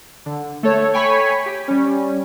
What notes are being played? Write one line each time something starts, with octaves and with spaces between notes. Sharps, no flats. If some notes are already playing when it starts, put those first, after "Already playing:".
D3
A3 A4 C#5
C#5 G5 G#5 B5 C#6 B6
G4
G3 C#4